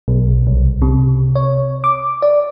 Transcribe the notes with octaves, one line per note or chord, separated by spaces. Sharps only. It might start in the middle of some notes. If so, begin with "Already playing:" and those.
B1
C2
C3
C#5
D6
D5